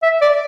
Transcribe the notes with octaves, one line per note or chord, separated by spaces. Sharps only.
E5
D5